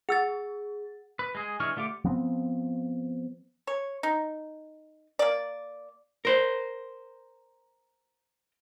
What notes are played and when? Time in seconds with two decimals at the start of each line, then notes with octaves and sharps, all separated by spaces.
0.09 G#4 F#5 E6 A6
1.19 B4
1.35 G#3 G#4
1.60 E3 G#3 D4 C#6 F6
1.76 D3 A3 F4 G4 D6
2.05 F3 B3 C4
3.67 C#5
4.03 D#4
5.19 A#3 D5
6.25 A#4 C5